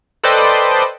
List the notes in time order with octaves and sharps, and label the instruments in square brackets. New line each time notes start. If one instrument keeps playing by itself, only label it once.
[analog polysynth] A4 B4 C5 D5 D#5 G5